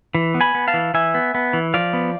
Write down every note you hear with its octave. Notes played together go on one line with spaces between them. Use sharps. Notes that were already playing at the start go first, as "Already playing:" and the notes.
E3
B3
G#5 B5
B3
F5 A5
E3
E3 E5 G#5
B3
B3
E3
F3 D5 F5
B3